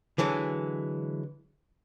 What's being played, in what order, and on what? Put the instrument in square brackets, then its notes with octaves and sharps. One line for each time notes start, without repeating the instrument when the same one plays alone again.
[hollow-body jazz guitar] D3 E3 F#3 G#3